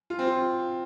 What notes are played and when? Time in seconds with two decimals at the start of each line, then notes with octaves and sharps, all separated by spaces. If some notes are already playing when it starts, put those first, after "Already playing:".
0.10 F4
0.19 C4
0.27 F4